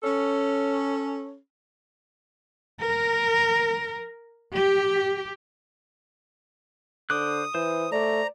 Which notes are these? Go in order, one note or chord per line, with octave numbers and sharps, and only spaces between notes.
C#4 A4
A#4
G4
D3 C5 D6 D#6 F#6
E3 C5
A3 D5 A#5